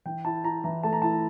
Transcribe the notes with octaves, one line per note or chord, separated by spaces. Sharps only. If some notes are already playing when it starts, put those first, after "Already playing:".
E3 G5
E4 A5
E4 A#5
E3 A#5
A3 A5
A#5
E4 A5